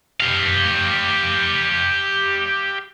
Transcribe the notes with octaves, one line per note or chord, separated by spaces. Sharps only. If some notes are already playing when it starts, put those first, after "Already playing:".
G4 F5